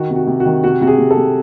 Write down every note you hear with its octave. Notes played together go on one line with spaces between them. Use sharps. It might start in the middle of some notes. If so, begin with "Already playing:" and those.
Already playing: D#3 F#4
C3
F#4
C3
F#4
D#3
C3 F#4
C3 F#4
G#4
C3
A4
C3